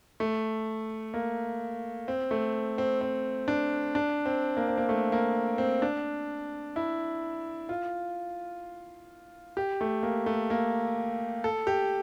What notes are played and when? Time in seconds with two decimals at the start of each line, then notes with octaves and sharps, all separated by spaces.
0.20 A3
1.14 A#3
2.08 C4
2.31 A3
2.78 C4
3.01 C4
3.48 D4
3.95 D4
4.25 C4
4.57 A#3
4.68 C4
4.77 A#3
4.89 A3
5.12 A#3
5.58 C4
5.82 D4
6.76 E4
7.69 F4
9.57 G4
9.81 A3
10.03 A#3
10.26 A3
10.50 A#3
11.44 A4
11.67 G4